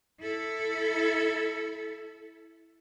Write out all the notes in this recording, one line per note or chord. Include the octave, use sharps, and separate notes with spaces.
E4 A4